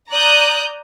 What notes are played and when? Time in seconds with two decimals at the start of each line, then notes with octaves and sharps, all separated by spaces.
0.11 D5 A#5 D#6 F#6 G6